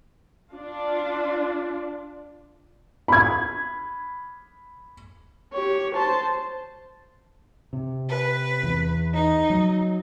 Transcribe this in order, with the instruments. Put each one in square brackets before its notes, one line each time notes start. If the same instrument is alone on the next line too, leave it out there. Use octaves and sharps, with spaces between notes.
[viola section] D4 F4
[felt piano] B5 G#6
[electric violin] G4 C#5
C5 A5
[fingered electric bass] C3
[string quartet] B4
[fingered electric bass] E2
[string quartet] D#4
[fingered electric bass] F#3